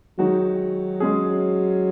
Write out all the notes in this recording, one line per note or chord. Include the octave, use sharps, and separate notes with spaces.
D#3 F#3 G#3 D#4 F#4
G#3 C#4 G#4